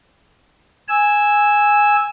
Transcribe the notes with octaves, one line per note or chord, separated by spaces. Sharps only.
G#5 E6